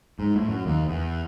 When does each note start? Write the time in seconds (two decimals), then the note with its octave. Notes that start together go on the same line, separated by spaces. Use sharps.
0.19 G#2
0.36 A2
0.48 F#2
0.66 D#2
0.88 E2